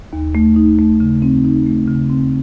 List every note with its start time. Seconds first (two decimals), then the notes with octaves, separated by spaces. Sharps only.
0.13 D#2
0.35 A3
0.56 D#4
0.79 A3
1.00 C#3
1.22 C4
1.45 D#4
1.66 A3
1.87 C#3
2.09 C4